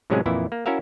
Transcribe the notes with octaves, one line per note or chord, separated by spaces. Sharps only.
A2 C3 F#3 G#3 C#4 G#4
F2 A#2 E3 E4
A#3
C#4 E4 F#4 A#4 E5 F5